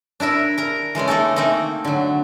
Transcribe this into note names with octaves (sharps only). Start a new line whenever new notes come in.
D4 E4 A#4 E5
A#4 A#5
E3 G#3 A3 C#4
A3 A#3 D#4 A4
A3 A#3 C4 D#4
D3 F#3